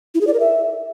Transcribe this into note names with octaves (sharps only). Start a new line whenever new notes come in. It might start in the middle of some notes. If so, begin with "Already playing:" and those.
E4
G#4
D5
A#4
E5